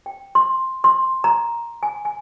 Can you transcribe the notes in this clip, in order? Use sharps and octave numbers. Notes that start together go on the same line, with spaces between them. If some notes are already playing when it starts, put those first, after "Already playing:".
G5
C6
C6
A#5
G#5
G#5